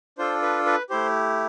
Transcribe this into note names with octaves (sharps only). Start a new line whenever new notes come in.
D4 F4 A4 C5
B4
B4
A3 E4 G4 C5